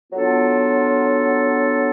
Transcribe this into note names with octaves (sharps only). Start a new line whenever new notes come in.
F#3 B3 D4 F4 A4